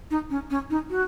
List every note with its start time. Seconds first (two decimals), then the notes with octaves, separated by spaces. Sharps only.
0.10 D#4
0.30 C#4
0.50 C#4
0.70 D#4
0.90 F#4